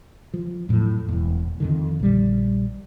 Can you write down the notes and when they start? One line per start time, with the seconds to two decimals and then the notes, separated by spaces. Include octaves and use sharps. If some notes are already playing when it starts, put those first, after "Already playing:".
0.34 F3
0.69 F2 A2 F#3
1.08 E1 E2
1.60 F2 D3 D#3
2.00 A#1 G3